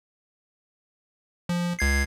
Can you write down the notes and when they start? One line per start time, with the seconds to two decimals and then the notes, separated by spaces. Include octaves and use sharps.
1.49 F3
1.79 C#2 G#6 C7